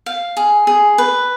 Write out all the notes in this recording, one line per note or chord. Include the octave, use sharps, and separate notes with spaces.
F5
G#4
G#4
B4